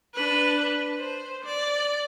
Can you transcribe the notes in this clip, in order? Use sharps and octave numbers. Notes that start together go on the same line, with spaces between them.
D4 B4
C5
D5